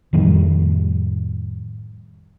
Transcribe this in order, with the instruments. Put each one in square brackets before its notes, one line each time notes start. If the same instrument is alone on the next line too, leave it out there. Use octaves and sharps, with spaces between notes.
[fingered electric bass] F2 A2 D#3 G3